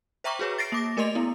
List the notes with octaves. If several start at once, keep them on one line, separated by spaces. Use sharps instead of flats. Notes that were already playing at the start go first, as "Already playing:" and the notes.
C5 E5 G5 A#5 C#6 D6
F#4 G#4 B4 C#5
A6 A#6 C7 D7
A#3 D6 A#6
A3 A#4 D5 D#5 C6 F7
B3 E4